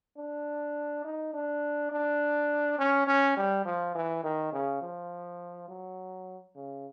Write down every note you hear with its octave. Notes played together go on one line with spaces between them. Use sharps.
D4
D#4
D4
D4
C#4
C#4
G3
F3
E3
D#3
C#3
F3
F#3
C#3